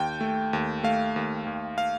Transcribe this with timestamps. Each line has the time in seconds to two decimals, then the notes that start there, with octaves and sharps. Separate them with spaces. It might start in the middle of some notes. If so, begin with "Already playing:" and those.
Already playing: D#2 G5
0.21 A3
0.53 D#2
0.83 A3 F5
1.16 D#2
1.47 D#2
1.78 F5